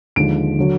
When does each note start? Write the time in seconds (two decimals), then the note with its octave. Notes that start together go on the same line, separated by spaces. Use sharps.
0.16 D#2 D3 F3 G#3 D7
0.59 D3 F#3